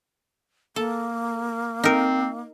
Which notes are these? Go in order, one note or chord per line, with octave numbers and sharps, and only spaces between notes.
A#3 A4
C4 D#4 A#4